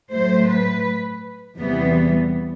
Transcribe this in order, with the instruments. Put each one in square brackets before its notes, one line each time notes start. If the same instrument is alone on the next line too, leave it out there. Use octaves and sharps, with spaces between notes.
[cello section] A2 F#3 A3 C5
B4
E2 C3 E3 G3 B3